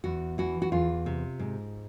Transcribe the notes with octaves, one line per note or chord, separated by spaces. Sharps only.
E2 F#4
E3 F#4
F#4
E2 F4
C3
G#2